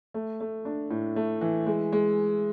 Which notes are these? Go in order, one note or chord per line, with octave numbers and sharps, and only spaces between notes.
A3
A3
D4
A2
A3
E3
G#3
G#3